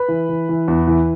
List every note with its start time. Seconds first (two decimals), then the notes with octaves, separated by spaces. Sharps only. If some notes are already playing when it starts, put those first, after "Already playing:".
Already playing: B4 B5
0.09 E3
0.29 E3
0.49 E3
0.68 E2
0.87 E3